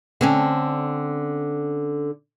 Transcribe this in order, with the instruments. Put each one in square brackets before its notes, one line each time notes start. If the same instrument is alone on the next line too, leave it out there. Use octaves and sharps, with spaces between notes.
[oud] D3 C4 C#4